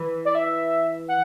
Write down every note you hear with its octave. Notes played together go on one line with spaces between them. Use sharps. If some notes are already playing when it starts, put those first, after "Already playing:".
Already playing: E3
D5
E5
F#5